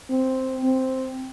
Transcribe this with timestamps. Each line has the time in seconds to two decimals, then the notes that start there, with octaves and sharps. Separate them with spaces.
0.10 C4
0.63 C4